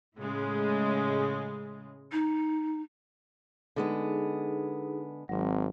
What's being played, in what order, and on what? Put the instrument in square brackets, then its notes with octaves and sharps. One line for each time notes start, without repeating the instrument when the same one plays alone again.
[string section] A2 C#3 G#3
[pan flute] D#4
[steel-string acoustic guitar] D3 G#3 B3 [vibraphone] D#4 G#4
[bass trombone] G#1 [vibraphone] F#3 C4